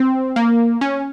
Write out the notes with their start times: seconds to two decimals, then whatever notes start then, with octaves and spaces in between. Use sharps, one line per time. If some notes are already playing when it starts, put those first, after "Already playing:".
Already playing: C4
0.36 A#3
0.81 C#4